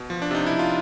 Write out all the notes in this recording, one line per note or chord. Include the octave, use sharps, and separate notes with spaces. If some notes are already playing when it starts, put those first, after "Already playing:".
Already playing: B2
F3
D4
C3 D#4
F3 E4
F4